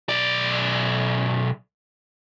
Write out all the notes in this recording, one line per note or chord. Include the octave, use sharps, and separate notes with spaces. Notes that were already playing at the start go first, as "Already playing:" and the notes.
B1 D5